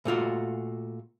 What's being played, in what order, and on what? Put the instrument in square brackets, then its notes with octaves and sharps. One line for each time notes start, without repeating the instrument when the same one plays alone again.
[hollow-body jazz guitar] A#2 A3 F4 F#4